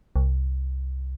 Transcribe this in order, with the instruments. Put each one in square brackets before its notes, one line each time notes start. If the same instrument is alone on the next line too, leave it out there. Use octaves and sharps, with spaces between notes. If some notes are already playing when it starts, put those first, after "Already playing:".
[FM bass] C2